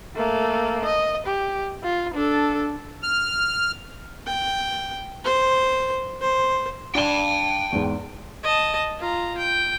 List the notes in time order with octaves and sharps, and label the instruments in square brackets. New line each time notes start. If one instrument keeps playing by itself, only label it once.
[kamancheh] A3 A#3
D#5
G4
F4
D4 A4
[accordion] F6
[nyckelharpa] G5
C5
C5
[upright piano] D4 G7 [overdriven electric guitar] G5 A5
[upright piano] E2 G#2
[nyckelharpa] D#5 A5
F4 A#5
G5